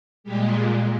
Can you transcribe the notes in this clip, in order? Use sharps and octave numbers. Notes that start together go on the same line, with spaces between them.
A#2 G3 G#3 G4